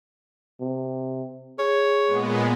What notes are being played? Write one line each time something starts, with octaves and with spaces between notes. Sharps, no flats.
C3
G#4 C#5
A#2 G#3 B3